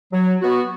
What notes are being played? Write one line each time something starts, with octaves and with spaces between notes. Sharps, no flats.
F#3
B3 F#4